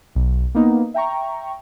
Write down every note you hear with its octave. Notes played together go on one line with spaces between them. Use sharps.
B1
A#3 B3 D#4
E5 G5 A#5 C#6